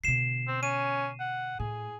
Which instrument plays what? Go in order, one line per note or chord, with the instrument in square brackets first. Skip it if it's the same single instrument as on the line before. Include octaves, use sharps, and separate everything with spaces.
[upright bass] B2 D3 [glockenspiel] C7 E7
[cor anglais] C4
[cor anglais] C#4 [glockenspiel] D#7
[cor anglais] F#5
[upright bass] A2 [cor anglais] G#4